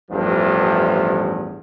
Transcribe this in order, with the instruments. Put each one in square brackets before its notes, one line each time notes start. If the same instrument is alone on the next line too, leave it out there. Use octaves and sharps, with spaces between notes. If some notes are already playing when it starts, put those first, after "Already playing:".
[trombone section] A1 E2 G2 F3